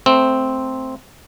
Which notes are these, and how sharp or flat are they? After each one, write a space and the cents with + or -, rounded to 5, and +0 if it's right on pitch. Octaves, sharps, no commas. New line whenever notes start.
A3 +0 C4 +0